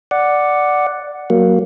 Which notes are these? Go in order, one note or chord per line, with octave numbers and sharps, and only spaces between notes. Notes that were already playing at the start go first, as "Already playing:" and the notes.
D5 F#5
F#3 A#3